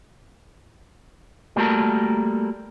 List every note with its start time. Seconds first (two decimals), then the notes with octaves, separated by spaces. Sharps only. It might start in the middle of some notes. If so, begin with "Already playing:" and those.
1.56 G3 A3 A#3 F#4 A4 A#4